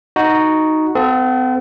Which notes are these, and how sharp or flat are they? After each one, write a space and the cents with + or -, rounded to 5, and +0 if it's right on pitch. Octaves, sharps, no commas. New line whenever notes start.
D#4 +0 F#4 +0
C4 -45 A4 +0 F5 +35